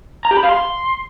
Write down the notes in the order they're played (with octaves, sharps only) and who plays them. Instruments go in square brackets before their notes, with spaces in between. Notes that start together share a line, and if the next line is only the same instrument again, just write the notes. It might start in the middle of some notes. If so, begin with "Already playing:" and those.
[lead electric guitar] A#5
G4
B5
F5
C6